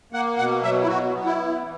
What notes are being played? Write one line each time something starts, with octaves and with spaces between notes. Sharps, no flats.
A#3 F#5
B2 F#5
F#3 E5
E4
B2 F#4
B3
E4
B3
E3